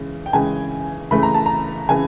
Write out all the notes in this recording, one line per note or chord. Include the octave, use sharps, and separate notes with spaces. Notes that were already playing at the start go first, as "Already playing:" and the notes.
Already playing: C#3 E3 G#3
G5
C#3 E3 G#3 G#5
C#3 E3 A3 B5
A#5
A5
A#5
C#3 E3 G#5